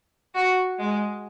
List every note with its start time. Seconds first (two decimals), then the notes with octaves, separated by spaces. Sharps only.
0.34 F#4
0.79 G#3